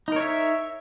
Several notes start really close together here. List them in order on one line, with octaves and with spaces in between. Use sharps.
D#4 A#4 C#5 E5